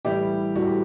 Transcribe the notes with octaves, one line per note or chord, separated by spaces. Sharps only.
A2 E3 G3 E4 G4
A2 E3 G3 F#4
G4